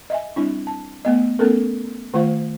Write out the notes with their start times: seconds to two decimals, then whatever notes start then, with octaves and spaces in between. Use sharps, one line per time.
0.10 D#5 E5 G#5
0.36 G3 C4 D4 E4
0.67 A5
1.05 A3 B3 D#5
1.39 A3 B3 C#4 A4 A#4
2.14 D#3 A3 F4 C5 F5